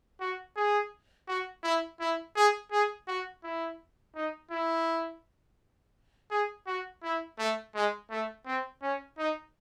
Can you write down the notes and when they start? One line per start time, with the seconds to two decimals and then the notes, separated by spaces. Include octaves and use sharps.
0.20 F#4
0.56 G#4
1.28 F#4
1.64 E4
2.00 E4
2.36 G#4
2.72 G#4
3.08 F#4
3.44 E4
4.15 D#4
4.51 E4
6.31 G#4
6.67 F#4
7.03 E4
7.39 A3
7.75 G#3
8.10 A3
8.46 C4
8.82 C#4
9.18 D#4